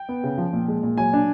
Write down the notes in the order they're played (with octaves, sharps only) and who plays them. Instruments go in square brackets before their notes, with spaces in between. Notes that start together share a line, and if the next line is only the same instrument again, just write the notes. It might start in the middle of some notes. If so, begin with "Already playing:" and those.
Already playing: [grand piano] G5
B3
C#3
F3
A#2
G#3
A#2
F#3 G#5
D4